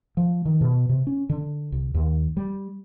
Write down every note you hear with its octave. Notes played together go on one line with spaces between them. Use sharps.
F3
D#3
B2
C3
C#4
D3
C2
D#2
G3